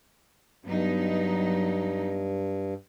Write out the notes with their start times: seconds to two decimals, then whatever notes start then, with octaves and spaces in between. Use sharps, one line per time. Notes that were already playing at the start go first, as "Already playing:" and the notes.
0.65 G2 F#3 B3 D#4